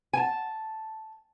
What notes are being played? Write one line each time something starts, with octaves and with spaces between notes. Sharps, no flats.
G#5 A5